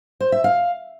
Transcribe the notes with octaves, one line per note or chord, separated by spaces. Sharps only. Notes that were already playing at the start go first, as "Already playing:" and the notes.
C5
E5
F5